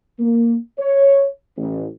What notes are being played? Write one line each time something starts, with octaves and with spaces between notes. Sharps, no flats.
A#3
C#5
A1